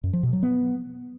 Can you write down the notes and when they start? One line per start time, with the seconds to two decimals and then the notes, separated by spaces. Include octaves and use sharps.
0.04 F#2
0.13 F3
0.23 B2
0.33 F#3
0.43 B3